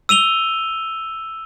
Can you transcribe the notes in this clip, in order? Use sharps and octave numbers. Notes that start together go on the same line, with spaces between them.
E6 D#7 F7 G7